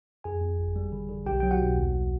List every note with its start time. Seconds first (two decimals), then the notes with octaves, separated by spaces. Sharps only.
0.24 F2 G#4 G#5
0.41 F2
0.58 G1
0.76 G3
0.92 D3
1.09 D3
1.26 B1 G4 G5
1.40 F#3 G5
1.51 F#4 F#5
1.60 B1
1.76 D#2